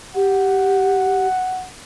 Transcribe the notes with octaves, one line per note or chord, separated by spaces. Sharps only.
G4 F#5